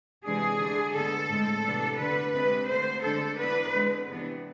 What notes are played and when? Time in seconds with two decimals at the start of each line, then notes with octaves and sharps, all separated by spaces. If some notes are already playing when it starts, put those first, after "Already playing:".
0.25 C3 E3 G#3 D4 G#4
0.60 D3 A3 D4
0.94 D3 G#3 B3 A4
1.29 A2 G#3 C4
1.64 C3 E3 B3 D4
1.99 D3 A3 D4 B4
2.34 C3 G#3 D4 B4
2.68 D3 A3 C4 C5
3.04 D3 G#3 D4 A4
3.39 E3 B3 D4 B4
3.73 D3 G#3 C4
4.08 C3 E3 B3 D4